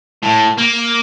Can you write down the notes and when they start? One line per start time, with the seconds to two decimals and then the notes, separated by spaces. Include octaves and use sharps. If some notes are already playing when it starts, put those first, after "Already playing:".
0.23 A2
0.58 A#3